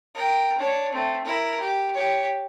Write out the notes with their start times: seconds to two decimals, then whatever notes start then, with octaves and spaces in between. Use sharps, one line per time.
0.14 A#4 G5
0.58 D4 C#5
0.92 A3 C4
1.24 E4 A#4
1.60 G4
1.93 G4 C#5